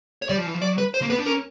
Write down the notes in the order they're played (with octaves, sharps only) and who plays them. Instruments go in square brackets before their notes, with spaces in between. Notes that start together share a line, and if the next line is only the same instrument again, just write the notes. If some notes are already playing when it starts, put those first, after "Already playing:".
[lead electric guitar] C#5
[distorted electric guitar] G3 [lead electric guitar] D5
[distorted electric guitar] F3
E3
F3
[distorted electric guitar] F#3 [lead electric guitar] D5
[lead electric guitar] B4
C5
[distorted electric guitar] A#3
[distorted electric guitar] B3 [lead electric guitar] B4
[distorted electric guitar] D4
[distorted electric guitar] C#4 [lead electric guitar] A#4